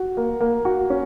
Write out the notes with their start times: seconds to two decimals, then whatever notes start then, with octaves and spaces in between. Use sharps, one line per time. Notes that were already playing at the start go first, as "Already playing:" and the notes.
Already playing: F#4
0.17 A#3
0.40 A#3
0.65 F#4
0.90 C#4